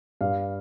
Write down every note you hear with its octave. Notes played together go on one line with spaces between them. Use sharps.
G2 F5